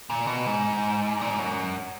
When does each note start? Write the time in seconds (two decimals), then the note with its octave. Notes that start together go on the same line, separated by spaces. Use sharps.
0.10 A#2
0.27 B2
0.46 G#2
1.21 A#2
1.30 G#2
1.39 F#2